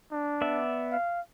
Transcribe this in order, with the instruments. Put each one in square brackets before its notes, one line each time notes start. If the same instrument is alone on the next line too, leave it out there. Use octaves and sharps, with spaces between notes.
[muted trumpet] D4
[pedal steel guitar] B3 D5 E5
[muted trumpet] F5